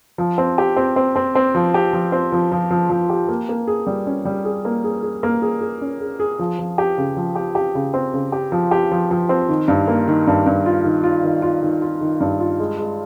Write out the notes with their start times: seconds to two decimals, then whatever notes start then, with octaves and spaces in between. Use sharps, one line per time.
0.18 F3
0.38 C4
0.58 G4
0.76 C4
0.96 C4
1.16 C4
1.35 C4
1.55 F3
1.74 G4
1.93 F3
2.12 C4
2.32 F3
2.52 F3
2.71 F3
2.90 F3
3.10 G4
3.28 A#3
3.49 A#3
3.67 G#4
3.87 G3
4.07 C#4
4.25 G3
4.45 G#4
4.65 A#3
4.84 G#4
5.03 G#4
5.23 A#3
5.42 G#4
5.61 G#4
5.81 C#4
6.01 G#4
6.20 G#4
6.39 F3
6.59 F3
6.78 G4
6.98 C#3
7.17 F3
7.35 G4
7.55 G4
7.75 C#3
7.94 C4
8.14 C#3
8.32 G4
8.52 F3
8.71 G4
8.92 F3
9.11 F3
9.29 C4
9.49 D#3
9.68 G2
9.88 A#3
10.07 D#3
10.27 G2
10.46 G2
10.66 F4
10.84 D#3
11.04 F4
11.23 D#3
11.42 F4
11.63 D#3
11.82 F4
12.01 D#3
12.20 G2
12.40 F4
12.59 G#3
12.78 G#3